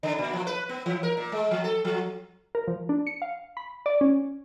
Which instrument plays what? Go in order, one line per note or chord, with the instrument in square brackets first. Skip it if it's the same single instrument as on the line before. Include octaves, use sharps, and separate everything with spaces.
[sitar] C#3
A#2
F3
B4
B3
E3
A#4
A#2
G#3
F3
A4
F3
[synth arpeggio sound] A#4
F3
D4
C#7
F5
B5
D5
C#4